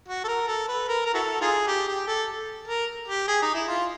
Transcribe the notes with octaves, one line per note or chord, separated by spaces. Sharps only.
F#4
A4
A#4
A4
B4
A#4
A#4
E4 F#4 A4
D#4 F4 G#4
G4
G4
A4
A#4
G4
G#4
D#4
E4
F4